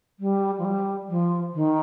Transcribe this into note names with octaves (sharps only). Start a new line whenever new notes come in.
G3
F3
G3
F3
D#3